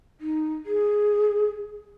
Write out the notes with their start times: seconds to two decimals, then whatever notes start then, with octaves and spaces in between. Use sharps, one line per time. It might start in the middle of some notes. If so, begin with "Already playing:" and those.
0.20 D#4
0.66 G#4